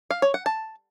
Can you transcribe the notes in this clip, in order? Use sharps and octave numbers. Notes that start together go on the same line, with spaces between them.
F5
C#5
F#5
A5